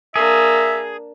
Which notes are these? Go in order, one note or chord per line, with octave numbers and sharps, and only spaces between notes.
A#3 D4 G#4 E5